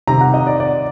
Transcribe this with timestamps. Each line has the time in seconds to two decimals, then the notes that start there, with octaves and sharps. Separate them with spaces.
0.07 C3 D#3 A#5
0.21 F#5
0.34 D#5
0.47 D5
0.60 D5